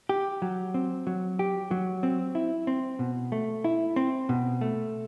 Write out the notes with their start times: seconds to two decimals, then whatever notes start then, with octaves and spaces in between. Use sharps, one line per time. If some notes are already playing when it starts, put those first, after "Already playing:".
0.09 G4
0.42 F#3
0.74 C4
1.07 F#3
1.39 G4
1.71 F#3
2.03 C4
2.35 E4
2.67 C4
2.99 B2
3.32 A3
3.64 E4
3.96 C4
4.29 B2
4.61 A3